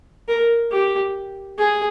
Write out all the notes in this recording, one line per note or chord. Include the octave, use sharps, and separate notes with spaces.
A#4
G4
G#4